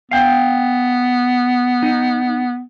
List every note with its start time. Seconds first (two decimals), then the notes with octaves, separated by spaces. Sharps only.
0.11 B3 F5 G5
1.83 D#4